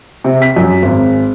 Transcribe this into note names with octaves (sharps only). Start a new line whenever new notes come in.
C3
B6
F#2
G#1